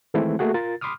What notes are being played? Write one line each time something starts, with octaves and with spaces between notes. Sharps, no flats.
D#3 E3 G#3 A3 C4 E4
A3 A#3 F#4 G#4 F#5
F4 A#4 A6
B5 C6 D6 D#6 F6